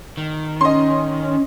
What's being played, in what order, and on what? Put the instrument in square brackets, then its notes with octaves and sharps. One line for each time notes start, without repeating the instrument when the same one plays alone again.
[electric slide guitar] D#3
[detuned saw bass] C#4 [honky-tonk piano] D#5 C6